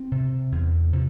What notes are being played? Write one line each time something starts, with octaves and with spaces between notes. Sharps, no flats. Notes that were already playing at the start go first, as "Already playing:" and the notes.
Already playing: C4
C3
E2
C3